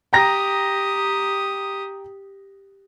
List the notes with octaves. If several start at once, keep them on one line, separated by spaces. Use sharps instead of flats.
G4 G5 A#5 D#6 A#6